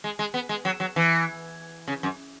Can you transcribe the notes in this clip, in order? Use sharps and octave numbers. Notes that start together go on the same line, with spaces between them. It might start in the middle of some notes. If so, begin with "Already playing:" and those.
G#3
G#3
B3
G#3
F#3
F#3
E3
C#3
F#2